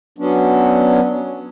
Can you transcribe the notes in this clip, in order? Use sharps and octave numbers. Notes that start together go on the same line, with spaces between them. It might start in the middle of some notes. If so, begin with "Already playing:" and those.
F#3 B3 C#4 D4